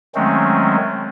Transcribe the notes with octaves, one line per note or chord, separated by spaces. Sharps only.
D#3 F#3 G#3 A3 C4 C#4